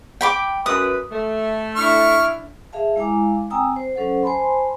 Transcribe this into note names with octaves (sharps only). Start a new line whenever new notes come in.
G5 B5 D6
F#2 B4 D#6
A3
D4 E4 C#6 F6
G#4 E5 F5 A5
G#3 E4 F5 G#5 A#5 D6
C4 G5 G#5 A#5 D#6 E6
C5
F#3 C#4 A4 C5 F#5
C5 G#5 A5 B5 C6